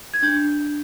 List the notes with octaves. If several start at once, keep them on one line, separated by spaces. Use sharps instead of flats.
G#6
D4 G6